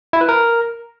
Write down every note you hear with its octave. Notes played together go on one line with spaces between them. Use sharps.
E4
B4
A#4